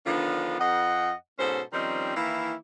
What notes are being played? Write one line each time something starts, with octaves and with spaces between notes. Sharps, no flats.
D3 D#3 F3 B3 D4 F4
F2 D#5 F#5
G#2 B2 C#4 A4 C5
D#3 F3 G3 C4 C#4 D#4
D#3 E3 A#3 E4